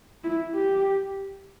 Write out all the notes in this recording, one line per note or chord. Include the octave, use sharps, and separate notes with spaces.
E4
G4